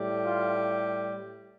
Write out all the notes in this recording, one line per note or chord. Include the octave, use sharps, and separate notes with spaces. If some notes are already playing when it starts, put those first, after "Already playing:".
Already playing: A2 G3
F4